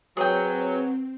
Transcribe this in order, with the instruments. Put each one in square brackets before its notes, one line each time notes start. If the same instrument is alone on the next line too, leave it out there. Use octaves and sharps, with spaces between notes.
[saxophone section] F#3 [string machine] C4 [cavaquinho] G#4 G5 [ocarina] B4